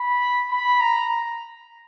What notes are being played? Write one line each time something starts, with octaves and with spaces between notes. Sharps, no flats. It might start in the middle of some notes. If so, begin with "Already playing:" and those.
Already playing: B5
B5
A#5